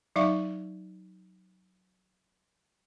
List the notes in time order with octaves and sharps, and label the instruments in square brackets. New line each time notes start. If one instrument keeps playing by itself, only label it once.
[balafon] F#3 D#4 E5 F5 C#6